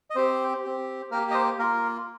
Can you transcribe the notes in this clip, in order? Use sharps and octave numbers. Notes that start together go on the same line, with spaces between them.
D#5
C4 G4 C5
C4 G4
A#3 G4 A#4
D#5
C5
A#3 F4 A#4